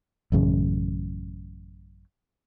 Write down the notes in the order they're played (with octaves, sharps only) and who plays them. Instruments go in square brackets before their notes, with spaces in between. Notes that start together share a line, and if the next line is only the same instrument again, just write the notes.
[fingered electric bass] A1 F#2 C#3